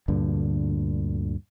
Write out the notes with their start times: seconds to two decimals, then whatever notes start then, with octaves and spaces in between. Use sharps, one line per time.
0.08 D2 G2 A#2 D3